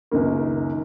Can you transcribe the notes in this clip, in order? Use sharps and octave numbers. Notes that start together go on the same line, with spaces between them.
C#2 F#2 D#3 A#3